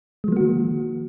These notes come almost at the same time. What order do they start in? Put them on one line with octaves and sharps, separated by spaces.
G#3 F3 A#3 F#4 D#3